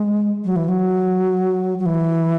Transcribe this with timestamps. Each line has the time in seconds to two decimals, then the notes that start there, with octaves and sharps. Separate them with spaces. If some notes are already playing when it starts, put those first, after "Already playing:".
Already playing: G#3
0.45 F#3
0.56 E3
0.68 F#3
1.79 F#3
1.86 E3